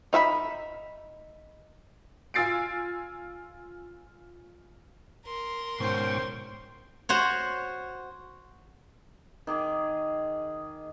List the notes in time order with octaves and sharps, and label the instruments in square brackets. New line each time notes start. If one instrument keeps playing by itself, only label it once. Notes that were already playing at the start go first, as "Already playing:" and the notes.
[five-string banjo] D#4 E5 F5 B5
[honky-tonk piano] F4 G#5 E6 A6 C7 D7
[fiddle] A#4 C6
[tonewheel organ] G#2 G5 C#6 [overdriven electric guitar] B2 C#4 [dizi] C5
[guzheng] F#4 C5 C#5
[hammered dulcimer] D#3 G#4 D6